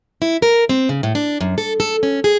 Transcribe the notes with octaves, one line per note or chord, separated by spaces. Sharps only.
E4
A#4
C4
C#3
A2
D4
F#2
A4
A4
C#4
G#4